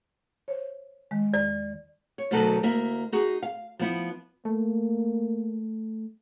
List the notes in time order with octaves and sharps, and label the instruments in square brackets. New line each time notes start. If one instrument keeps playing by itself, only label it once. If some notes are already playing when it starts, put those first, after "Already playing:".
[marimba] C5 C#5
D#3 G#3
[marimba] E2 [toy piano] D5
[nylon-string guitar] C#5
D2 B2 D#3 F#3 A4 B4
D2 A#3 E4 E5
D#4 F#4 G#4
F5
F3 B3 E4
[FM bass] A3 [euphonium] A#3